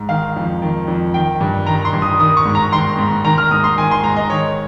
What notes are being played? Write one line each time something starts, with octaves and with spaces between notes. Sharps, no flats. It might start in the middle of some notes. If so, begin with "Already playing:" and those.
Already playing: G#2
D#3 F5
F2
D#3
F2
D#3 G5
G2
D#3 A#5
C6
G2
D#6
D#3 D#6
C#6
G#2
A#5
D#3 C6
G#2
D#3 A#5
F6
G#2 D#6
C6
D#3 G#5
C6
G#2 A#5
D#5
D#3 C#5